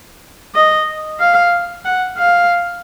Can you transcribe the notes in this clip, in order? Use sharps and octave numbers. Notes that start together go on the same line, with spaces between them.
D#5
F5
F#5
F5